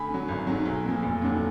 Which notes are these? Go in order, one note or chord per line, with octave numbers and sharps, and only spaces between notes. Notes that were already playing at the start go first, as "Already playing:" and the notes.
Already playing: D2 G#5 B5
D3 F#3
G#1
G#2 F#3
B1
A#2 F3
F1
D#2 D3 F#3